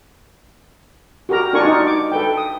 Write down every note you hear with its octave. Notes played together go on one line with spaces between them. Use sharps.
F#4 G4 A#4 A#5
D4 F4 F#4 A#4 G#5 C#6
D#4 C#6
D6
A4 B4 G5
D#6